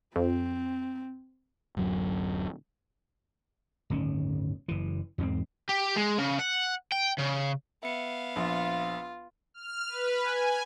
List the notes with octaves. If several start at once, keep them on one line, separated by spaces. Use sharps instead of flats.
F2 C4
D1 F#2 F#3
D1 G1 D#3 C#4
F#1 E3
E2 G#2 B3 C4
G4
G#3
C#3
F#5
G5
C#3
B3 E5 F5 C#7
A#1 F4
F6
B4
G#5